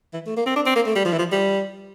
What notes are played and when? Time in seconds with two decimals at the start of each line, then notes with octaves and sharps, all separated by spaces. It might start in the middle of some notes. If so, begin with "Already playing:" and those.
0.13 E3
0.27 A3
0.37 A#3
0.46 C4
0.56 D4
0.66 C4
0.75 A#3
0.86 A3
0.95 G3
1.05 F3
1.13 E3
1.19 F3
1.32 G3